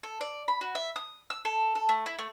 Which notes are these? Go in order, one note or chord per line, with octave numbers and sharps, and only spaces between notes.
A4
D5
B5
F#4
E5
D#6
E6
A4
A4
A3
E4
A3